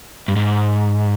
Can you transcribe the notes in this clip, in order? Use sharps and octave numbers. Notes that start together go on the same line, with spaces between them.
G2
G#2